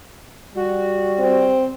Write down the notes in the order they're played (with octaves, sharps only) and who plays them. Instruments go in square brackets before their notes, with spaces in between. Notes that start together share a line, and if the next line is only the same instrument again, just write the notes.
[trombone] G3 [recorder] F#4
[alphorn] C4